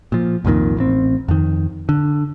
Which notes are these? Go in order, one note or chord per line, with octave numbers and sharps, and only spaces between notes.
A#2 F3
C2 F2 A#2 D#3
A1 C4
F2 D#3
D3